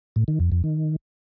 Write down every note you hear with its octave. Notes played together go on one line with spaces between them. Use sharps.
A2
D#3
F2
F2
D#3